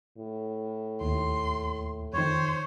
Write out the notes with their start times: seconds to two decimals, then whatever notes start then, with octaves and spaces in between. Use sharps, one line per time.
0.18 A2
1.01 D#2 C6
2.13 F2 D#3 C5 C#5